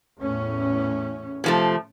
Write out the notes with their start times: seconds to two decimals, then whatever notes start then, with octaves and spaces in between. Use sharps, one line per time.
0.19 E2 A2 C#4
1.44 C3 F3 A3